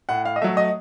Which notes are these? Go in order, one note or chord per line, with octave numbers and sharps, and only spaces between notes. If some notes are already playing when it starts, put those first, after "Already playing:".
A2 F#5
F5
D#5
F#3 A3 E5
D#5